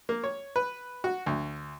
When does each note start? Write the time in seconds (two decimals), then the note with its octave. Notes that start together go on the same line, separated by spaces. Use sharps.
0.09 A#3
0.24 C#5
0.56 B4
1.04 F#4
1.26 D2